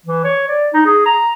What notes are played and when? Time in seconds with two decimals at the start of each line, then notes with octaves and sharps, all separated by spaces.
0.06 E3
0.24 C#5
0.48 D5
0.73 D#4
0.86 G#4
1.06 A#5